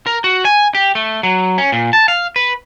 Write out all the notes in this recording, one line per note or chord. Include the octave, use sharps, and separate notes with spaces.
A#4
F#4
G#5
G4
A3
F#3
C#4
A#2
A5
F5
B4